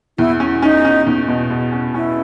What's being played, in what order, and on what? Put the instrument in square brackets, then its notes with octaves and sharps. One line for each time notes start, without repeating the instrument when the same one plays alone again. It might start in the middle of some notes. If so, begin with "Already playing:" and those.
[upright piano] E2 [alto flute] E4
[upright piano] C#4
[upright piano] C#4 [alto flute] D#4
[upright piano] C#4
E2
B2
B2
C#4
[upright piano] C#4 [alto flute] E4